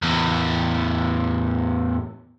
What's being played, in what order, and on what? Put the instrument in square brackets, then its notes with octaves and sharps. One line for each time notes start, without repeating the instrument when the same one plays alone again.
[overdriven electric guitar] E2 A2